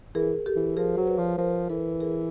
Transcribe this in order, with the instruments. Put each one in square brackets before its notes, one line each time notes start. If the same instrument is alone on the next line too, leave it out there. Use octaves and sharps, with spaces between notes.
[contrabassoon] E3 [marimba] G#4 A#4
[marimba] G4 A4
[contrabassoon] E3
[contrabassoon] F3 [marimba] G#4 A#4
[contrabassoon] F#3 [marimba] C5
[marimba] B4 C#5
[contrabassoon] F3
[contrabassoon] F3 [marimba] A#4 C5
[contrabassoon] E3 [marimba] A4 B4
[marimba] G#4 A#4